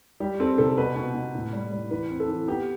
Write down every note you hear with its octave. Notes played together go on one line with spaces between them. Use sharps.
G3 G4
C4 A4
C3 A4
B2 B4
B2
B2
A2
G3
G3
E3 B4
C4
A4
E3
B3 G4